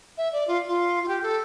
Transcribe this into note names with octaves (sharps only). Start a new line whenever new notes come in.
E5
D5
F4
F4
F4
G4
A4